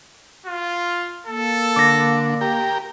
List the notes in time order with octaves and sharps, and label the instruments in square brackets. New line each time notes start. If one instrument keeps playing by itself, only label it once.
[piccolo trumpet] F4
[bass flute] A#3 [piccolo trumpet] A4
[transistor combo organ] D3 [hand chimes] D6 A#6
[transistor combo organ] G4 A#4